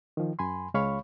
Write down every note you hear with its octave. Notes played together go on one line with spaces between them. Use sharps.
D#3 F3
F#2 G#5 B5 C6
C#2 G#3 C#5 F5 B5 C#6